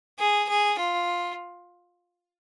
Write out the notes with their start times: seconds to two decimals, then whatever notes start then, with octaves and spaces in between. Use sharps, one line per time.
0.19 G#4
0.49 G#4
0.79 F4